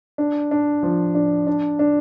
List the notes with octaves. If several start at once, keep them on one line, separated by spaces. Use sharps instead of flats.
D4
D4
F3
D4
D4
D4